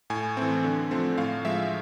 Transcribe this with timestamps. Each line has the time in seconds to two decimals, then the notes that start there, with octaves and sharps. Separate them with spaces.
0.10 A2 G#5
0.37 E3 A3 C4
0.64 D3
0.91 F3 A3 C4
1.18 A2 F5
1.45 F3 G#3 E5